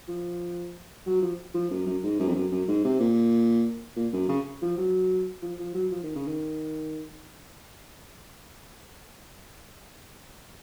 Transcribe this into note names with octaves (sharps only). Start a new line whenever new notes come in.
F3
F#3
F3
F3
F#2
F#2
G#2
F#2
F2
F#2
F#2
G#2
C3
A#2
A#2
F#2
C#3
F3
F#3
F3
F3
F#3
F3
D#3
C#3
D#3